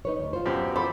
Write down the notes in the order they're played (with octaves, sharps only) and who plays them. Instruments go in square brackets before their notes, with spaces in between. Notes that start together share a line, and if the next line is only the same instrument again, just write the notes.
[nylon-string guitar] D#4 B4 C#5
D2
F4 C5
[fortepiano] F#2 B2 G4
[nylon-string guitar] E3 F4 G#4 [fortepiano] A4 C5 D6 [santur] B5